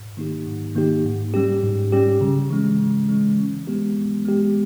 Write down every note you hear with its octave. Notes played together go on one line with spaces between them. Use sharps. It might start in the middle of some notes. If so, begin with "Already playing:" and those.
Already playing: G#2
D#3 A#3 D#4 G4
G#2
D#3 A#3 D#4 G4
G#2
G3 C#4 G4
G#2
G3 C#4 G4
C#3
E3 G#3 C#4
C#3
E3 G#3 C#4
E3
G#3 B3 G4
E3
G#3 B3 G4